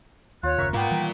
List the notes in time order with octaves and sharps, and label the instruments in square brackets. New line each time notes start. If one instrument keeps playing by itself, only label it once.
[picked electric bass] D#2 [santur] F4 [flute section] C#5 F#6
[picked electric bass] F#1 D#2 C#3 [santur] A#4 E5 C#6
[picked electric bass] G#2 [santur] A#3 B3 [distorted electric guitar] F4 A#4 [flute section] G5
[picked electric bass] D#3 E3 G3